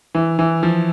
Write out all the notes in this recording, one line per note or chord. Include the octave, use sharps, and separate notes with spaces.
E3
E3
F3